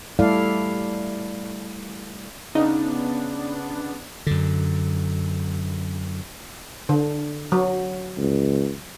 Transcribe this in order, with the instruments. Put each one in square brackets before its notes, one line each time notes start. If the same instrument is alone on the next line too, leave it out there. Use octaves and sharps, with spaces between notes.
[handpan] G3 A3 E4 A4 D5 F5
[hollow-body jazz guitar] C#3 [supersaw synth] B3 D4 [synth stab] D#4
[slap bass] F#2 D3
[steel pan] D3
F#3
[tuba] C#2